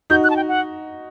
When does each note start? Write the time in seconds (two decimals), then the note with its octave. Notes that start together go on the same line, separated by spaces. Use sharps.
0.10 D#4 F#4 G6
0.24 F#6
0.30 A5
0.36 G5
0.48 F#5